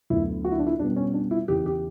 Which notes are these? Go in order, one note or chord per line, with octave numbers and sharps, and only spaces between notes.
D2 D3 F#3 B3 E4
F#4
E4
D4
E4
B2 G3 B3 D4
C#4
D4
E4
E2 C#3 E3 G4
G4